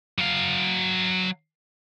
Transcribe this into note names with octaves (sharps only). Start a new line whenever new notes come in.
F#3 F5